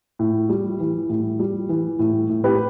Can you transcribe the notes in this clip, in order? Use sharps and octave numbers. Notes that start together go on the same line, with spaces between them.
A2
G3
E3
A2
G3
E3
A2
A2
G4 B4